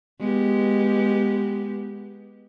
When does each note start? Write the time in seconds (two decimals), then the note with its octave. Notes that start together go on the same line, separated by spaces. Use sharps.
0.20 G#3 B3 G4